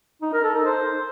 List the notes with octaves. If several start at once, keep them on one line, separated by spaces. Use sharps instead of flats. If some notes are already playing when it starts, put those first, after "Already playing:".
D#4
A#4
A4
D#4
C5